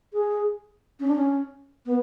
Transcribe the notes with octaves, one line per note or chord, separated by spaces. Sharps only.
G#4
C#4
D4
C#4
B3